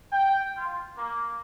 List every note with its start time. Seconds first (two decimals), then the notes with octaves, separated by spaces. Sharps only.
0.12 G5
0.57 F4
0.97 A#3